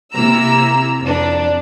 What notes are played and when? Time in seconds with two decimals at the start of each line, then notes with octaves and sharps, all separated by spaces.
0.13 C3 A#3 E4 A#5 E6
1.00 F2 D4